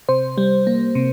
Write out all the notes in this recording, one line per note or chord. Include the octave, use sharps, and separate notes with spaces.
C3 C5
G3
A#3
C3